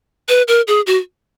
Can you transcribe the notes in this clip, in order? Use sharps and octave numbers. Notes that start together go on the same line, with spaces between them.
B4
A#4
G#4
F#4